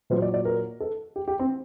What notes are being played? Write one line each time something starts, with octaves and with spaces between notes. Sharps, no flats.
A#2 F#3 C5
D5
D5
A#4
A4
G4
G4
C4